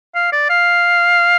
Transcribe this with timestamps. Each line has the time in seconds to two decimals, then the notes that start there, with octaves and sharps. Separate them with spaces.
0.15 F5
0.32 D5
0.50 F5